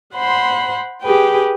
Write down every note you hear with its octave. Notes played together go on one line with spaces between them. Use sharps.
C5 F#5 B5 C6
G4 G#4 B4 G5